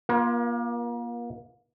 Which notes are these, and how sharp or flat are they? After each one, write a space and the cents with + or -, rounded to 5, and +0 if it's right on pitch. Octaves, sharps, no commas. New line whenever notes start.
A#3 +35 F4 +0 A#4 +45